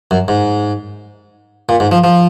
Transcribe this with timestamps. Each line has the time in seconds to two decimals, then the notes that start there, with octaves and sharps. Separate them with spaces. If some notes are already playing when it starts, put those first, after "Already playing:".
0.11 F#2
0.28 G#2
1.69 A#2
1.80 G#2
1.92 F3
2.04 F3